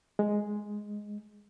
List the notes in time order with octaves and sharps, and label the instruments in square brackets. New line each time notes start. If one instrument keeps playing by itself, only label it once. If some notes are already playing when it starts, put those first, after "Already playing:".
[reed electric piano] G#3